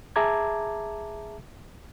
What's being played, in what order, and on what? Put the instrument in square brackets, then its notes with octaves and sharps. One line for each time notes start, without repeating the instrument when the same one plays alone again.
[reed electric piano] G#4 E5 A5 A#5 D6 G#6